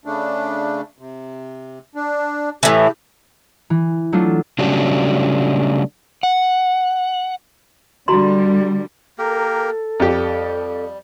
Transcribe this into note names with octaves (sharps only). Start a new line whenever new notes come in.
C#3 A3 D4
C3
D4
A2 E3 G4
E3
F#3 A3 D4 F4
C#3 F#3 G3 A3 D4
F#5
D3 G3 F#4 A#5 C6
A#3 G4 A4 A#4
F2 G3 G4